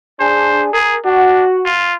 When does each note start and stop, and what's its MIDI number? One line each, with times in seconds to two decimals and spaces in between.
0.20 0.68 62
0.20 0.68 68
0.20 0.64 72
0.73 0.97 68
0.73 0.96 70
1.05 1.45 62
1.05 1.65 66
1.66 1.94 65